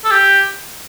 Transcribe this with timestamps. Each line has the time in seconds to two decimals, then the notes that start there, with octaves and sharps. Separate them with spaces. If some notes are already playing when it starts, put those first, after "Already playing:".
0.04 A4
0.11 G4